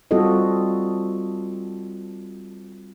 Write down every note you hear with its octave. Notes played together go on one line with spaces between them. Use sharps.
G3 C4 F4 F#4 A4 D#5